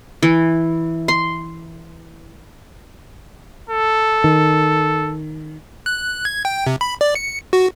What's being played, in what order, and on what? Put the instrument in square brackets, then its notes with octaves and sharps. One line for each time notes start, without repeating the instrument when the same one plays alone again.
[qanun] E3
C6
[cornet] A4
[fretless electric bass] D#3
[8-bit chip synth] F#6
G#6
G5
C3
B5
D5
C#7
F#4